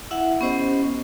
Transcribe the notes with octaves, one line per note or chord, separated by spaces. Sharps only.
E4 E5 F#5
B3 C#4 G4 C5 D#5